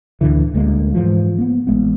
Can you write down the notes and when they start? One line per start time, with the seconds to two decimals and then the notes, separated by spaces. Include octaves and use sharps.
0.21 D2 A2 D3 E3
0.54 D2 G#3 A#3
0.95 G#2 E3 F3
1.38 A#3 B3
1.67 A1 G#3 B3